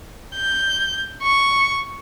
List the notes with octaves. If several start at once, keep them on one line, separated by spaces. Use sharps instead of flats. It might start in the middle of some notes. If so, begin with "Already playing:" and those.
G6
C#6